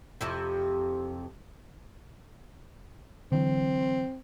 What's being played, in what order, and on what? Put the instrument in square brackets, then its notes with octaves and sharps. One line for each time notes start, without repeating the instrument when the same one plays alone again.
[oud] F2 C3 E4
[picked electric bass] D3 E3 F#3 [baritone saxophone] C4